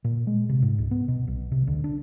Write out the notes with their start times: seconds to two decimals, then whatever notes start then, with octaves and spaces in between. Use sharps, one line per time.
0.04 A#2
0.27 G#3
0.49 C3
0.62 G#2
0.78 C#2
0.91 B3
1.08 B2
1.28 B1
1.52 C3
1.67 D2
1.84 D4